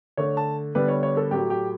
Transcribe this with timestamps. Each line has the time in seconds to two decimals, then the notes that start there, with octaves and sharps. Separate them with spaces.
0.17 D3 A3 C#5
0.37 A5
0.75 D3 G3 B3 B4
0.88 C#5
1.03 C#5
1.17 A4
1.31 A2 F#3 A3 G4
1.50 G4